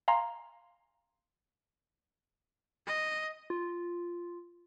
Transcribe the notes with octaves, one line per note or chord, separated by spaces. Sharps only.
F5 G#5 A#5 C6
D#5
F4